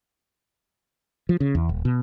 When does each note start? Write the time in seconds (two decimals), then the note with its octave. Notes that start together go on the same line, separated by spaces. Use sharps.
1.29 F3
1.40 C#3
1.55 E2
1.69 D#1
1.85 B2